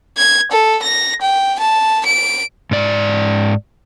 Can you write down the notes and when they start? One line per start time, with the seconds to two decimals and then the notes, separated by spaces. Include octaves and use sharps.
0.18 G#6
0.51 A4
0.82 A#6
1.22 G5
1.59 A5
2.05 D7
2.71 G#2 D5